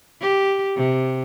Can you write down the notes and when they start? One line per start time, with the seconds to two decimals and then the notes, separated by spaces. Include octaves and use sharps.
0.21 G4
0.76 C3